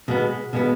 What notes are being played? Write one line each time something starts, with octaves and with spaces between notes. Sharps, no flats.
B2 G#3 B3
B2 G#3 B3